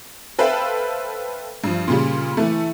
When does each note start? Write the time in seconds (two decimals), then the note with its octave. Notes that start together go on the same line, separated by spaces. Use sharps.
0.39 A4 B4 C5 E5 F5 G5
1.64 G2 F3
1.88 A#2 C#3 G3
2.37 E3 A3